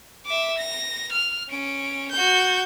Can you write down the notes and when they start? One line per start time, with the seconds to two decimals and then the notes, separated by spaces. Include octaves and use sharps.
0.26 E5 D6
0.58 A#6
1.12 F6
1.50 C#4 D7
2.11 F#4 G6